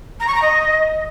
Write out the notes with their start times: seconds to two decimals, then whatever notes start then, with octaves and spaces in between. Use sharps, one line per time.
0.20 A#5
0.27 C#6
0.34 A#5
0.41 D#5